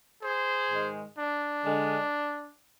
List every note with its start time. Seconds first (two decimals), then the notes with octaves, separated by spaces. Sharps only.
0.22 G#4 C5
0.69 G#2 D#3 G#3
1.17 D4
1.64 D3 G#3